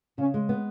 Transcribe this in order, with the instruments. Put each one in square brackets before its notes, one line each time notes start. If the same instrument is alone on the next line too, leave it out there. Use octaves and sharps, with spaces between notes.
[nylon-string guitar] C#3 [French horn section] C#4
[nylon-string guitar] G#3
B3